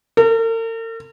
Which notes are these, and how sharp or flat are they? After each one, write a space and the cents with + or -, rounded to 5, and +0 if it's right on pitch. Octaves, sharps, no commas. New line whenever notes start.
A#4 -45